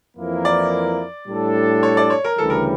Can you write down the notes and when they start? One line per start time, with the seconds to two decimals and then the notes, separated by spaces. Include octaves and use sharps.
0.17 F2 E3 A#3 E4 A#4
0.45 D5
1.27 A2 G3 D4 A4
1.83 C#5
1.97 D5
2.10 C#5
2.24 A#4
2.38 D2 C#3 E3 G3 A4
2.50 A#4